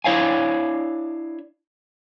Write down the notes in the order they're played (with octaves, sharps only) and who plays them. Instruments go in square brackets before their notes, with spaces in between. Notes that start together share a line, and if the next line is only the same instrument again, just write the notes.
[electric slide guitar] D4 E4 C#5 F5 G#5